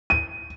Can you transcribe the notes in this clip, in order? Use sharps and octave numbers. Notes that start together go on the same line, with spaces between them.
D#7